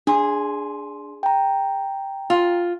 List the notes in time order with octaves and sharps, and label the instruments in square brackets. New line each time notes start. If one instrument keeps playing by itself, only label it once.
[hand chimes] D4 C6 [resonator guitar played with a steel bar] G#4
[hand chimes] G5 A#5
[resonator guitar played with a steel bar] F4